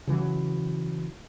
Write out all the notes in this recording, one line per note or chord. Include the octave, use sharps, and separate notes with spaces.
C#3 E3 F#3